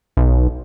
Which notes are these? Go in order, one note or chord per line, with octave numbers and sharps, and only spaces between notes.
B1